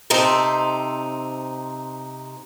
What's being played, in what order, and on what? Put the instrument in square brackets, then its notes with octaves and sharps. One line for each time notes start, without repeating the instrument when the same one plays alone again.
[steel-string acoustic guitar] C3 C4 D#4 A4